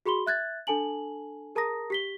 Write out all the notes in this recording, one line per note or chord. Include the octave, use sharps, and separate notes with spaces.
F#4 G#4 B5 C6 G7
E5 F#6 G#6 A6
D4 A4 G#5 A5 F#7
G#4 A#4 A5 A#5 D#6 A#6
G4 B6 G7